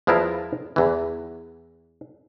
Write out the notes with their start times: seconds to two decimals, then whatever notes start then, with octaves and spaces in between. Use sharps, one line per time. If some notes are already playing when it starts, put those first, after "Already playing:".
0.07 E2 F3 B3 E4 F4 A#4
0.76 E2 E3